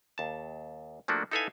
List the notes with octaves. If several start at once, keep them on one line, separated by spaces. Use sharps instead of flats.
D#2 A5
F3 A3 A#3 D4 F#4
D#4 E4 A4 B4 F5 G#5